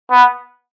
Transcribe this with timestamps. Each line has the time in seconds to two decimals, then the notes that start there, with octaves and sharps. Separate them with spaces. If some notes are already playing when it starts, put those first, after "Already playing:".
0.11 B3